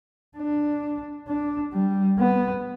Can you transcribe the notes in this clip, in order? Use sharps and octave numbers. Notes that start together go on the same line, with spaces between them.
D4
D4
G3
B3